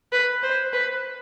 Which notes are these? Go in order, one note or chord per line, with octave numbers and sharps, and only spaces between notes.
B4
C5
B4